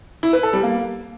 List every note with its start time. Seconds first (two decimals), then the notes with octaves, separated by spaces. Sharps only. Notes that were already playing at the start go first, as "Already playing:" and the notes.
0.23 E4
0.33 B4
0.43 A4
0.53 G3
0.63 A#3